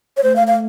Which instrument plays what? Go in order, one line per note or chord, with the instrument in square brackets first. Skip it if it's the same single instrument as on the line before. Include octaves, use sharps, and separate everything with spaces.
[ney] C#5
[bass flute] A3 [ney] C5
[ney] F5
F5